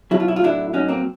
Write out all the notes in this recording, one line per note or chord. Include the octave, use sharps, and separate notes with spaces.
B2 F#3 E4
F4
E4
F4
A2 F#3 D4 E4
A2 F#3 C#4 D#4
A#3 C4